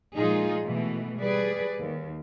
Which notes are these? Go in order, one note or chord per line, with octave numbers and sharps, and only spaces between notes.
A#2 F3 G#3 D#4 F4 G#4
B2 E3 A3
G3 G#4 B4 D5
D#2